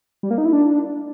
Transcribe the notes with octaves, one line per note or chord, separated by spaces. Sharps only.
G3
A#3
D#4
E4
D4